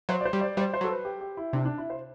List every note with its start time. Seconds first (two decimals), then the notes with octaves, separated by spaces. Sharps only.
0.09 F#3 C5
0.21 D5
0.25 C5
0.33 G3
0.41 D5
0.57 G3 C5
0.74 C5
0.81 F#3
0.84 A4
0.90 B4
1.05 G4
1.21 G4
1.37 E4
1.53 C3 D4
1.65 D4
1.78 E4
1.90 C5